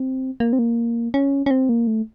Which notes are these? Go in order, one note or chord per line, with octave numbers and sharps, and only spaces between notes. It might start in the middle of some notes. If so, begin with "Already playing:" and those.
Already playing: C4
A#3
C4
A#3
C#4
C#4
C4
A#3
A3